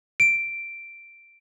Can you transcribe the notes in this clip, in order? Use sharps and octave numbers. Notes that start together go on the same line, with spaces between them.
D7